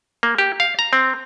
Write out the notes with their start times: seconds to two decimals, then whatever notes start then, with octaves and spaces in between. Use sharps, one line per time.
0.23 A#3
0.38 G4
0.60 F5
0.79 A#5
0.93 C4